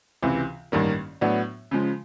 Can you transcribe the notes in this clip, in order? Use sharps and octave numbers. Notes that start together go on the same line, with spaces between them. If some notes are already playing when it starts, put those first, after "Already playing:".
C#2 C3 E3
A1 G2 D#3 G3 A#3
A2 F#3 B3 D4
C#3 F3 G#3